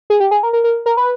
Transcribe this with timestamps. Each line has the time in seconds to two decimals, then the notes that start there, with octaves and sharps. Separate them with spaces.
0.10 G#4
0.20 G4
0.31 G#4
0.43 A#4
0.53 A#4
0.64 A#4
0.86 A#4
0.97 B4